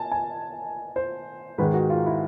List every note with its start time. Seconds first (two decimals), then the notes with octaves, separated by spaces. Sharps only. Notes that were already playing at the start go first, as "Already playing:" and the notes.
Already playing: G#5 A5
0.12 G#5
0.96 C5
1.58 G#2 D#3 G#3 B4
1.74 F#4
1.90 F4
2.06 E4